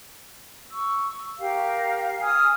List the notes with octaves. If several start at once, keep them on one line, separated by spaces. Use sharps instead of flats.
C#6 E6
G4 A#4 F5
G#5 D#6 F6